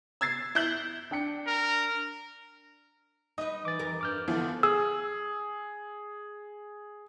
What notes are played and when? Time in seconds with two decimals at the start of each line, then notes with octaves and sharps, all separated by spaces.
0.21 E6 G#6 A6 C7
0.55 E4 G6 F#7
1.11 D4 G5 C#7
1.47 A#4
3.38 D#4 B4 D#5
3.65 E3 D6 A6
3.79 F2 E3 A#4
4.01 G2 D6 F6 G6
4.28 D3 E3 F3 B3
4.63 G#4 E6